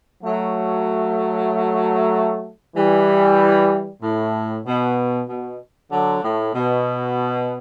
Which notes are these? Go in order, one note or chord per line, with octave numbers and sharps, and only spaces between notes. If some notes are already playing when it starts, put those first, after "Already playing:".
F#3 A3
E3 G3
A2
B2
B2
D3 F#3
A2
B2